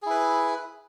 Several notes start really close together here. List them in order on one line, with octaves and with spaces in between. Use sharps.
G#4 E4 B4